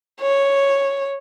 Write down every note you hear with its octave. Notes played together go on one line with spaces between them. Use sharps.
C#5